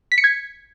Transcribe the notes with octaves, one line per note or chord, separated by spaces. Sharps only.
B6
C#7
G#6